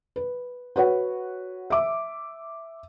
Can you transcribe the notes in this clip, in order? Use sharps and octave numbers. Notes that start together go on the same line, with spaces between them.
B4
F#4 B4 C#5 F#5
E5 D6